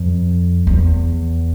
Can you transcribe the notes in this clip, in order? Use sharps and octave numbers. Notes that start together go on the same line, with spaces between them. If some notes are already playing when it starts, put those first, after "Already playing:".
Already playing: F2
E2